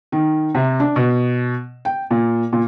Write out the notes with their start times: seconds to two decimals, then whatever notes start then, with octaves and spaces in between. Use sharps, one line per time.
0.12 D#3
0.55 C3
0.80 D4
0.96 B2
1.85 G5
2.10 A#2
2.52 A#2